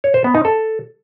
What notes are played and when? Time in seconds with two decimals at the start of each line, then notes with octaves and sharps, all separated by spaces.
0.04 C#5
0.14 C5
0.24 B3
0.35 D#4
0.45 A4